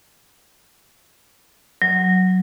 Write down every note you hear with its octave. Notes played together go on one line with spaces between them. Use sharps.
F#3